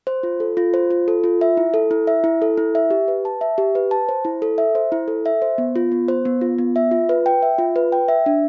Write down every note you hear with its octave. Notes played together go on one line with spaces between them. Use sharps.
C5
F4
A4
F4
C5
F4
A4
F4
E5
E4
A4
E4
E5
E4
A4
E4
E5
G4
B4
A5
E5
G4
B4
A5
C5
E4
A4
E5
C5
E4
A4
E5
C5
B3
F4
B3
C5
B3
F4
B3
E5
F4
B4
G5
E5
F4
B4
G5
E5
D4